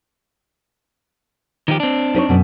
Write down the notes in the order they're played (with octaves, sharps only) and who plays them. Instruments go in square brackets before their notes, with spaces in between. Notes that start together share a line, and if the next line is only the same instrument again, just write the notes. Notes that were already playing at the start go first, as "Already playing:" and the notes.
[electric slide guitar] D#3 F3 G4
C4 D4
[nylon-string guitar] D#4 B4 C#5
F#2 B2